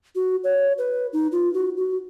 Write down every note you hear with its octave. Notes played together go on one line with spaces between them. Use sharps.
F#4
C#5
B4
D#4
F4
F#4
F#4